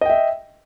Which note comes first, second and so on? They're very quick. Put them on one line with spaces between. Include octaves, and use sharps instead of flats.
D#5 G5 E5